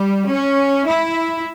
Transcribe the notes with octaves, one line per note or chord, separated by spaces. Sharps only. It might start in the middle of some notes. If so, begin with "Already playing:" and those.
Already playing: G3
C#4
E4